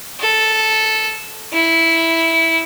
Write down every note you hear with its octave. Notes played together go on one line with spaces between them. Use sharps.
A4
E4